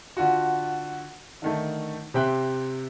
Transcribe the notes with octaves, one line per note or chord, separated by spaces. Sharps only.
D3 F4 F#4
D3 D#3 A3
C3 G4 C5 E5 G5 F#6